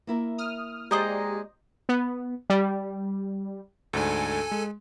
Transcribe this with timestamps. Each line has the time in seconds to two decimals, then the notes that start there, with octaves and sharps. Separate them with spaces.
0.07 A#3 E4 A#4
0.38 D#6 F6
0.91 G#3 G4 C5 D5 D#5 A#5
1.89 B3
2.50 G3
3.93 D2 G#2 D4 A4 G#5
4.51 G#3